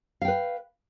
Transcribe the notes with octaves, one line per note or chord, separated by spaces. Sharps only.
B4 F5 G5